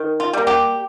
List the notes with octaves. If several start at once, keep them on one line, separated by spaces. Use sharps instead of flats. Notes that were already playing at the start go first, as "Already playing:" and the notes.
Already playing: D#3
F4
G3 A#3
G4